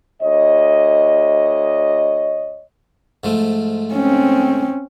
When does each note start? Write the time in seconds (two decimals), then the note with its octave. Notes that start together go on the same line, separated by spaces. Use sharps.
0.22 D2 C#5 D#5
3.24 G#2 F3 A3
3.94 C4 C#4